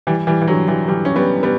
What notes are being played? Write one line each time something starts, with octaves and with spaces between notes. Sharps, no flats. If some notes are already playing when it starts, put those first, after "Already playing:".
E3 G3
E3 G3
E3
D3 F#3
E3 G3
E3 G3
C#4
G3 B3
G3 B3